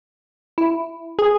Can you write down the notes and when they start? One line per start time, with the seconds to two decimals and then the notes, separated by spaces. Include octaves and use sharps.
0.58 E4
1.19 G#4